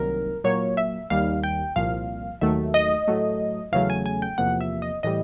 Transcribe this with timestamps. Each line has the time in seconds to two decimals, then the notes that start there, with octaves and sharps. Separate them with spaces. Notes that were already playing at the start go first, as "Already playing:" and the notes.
Already playing: C2 C3 D#3 F#3 A#3 A#4
0.44 A#2 F#3 A#3 C#5
0.77 E5
1.10 D#2 D#3 G3 F5
1.43 G5
1.76 C2 A#2 F3 F5
2.41 D#2 D#3 F#3 A3 E5
2.74 D#5
3.08 A2 F#3 A3
3.72 E2 C#3 F#3 A3 F5
3.90 G#5
4.06 G#5
4.22 G5
4.38 E2 C3 F3 A#3 F#5
4.61 E5
4.82 D#5
5.03 A2 E3 G3 D#5